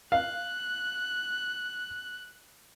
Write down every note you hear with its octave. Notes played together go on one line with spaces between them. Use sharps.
F5 F#6